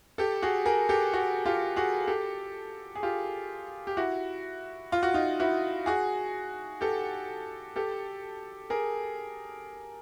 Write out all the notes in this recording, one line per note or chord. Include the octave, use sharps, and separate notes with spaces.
G4 A4
F#4 G#4
G#4 A#4
G4 A4
F#4 G#4
F4 G4
F#4 G#4
G4 A4
G#4
F4 G4
G4
E4 F#4
F4
F#4
D#4 F4
E4 F#4
F#4 G#4
G4 A4
G4 A4
G#4 A#4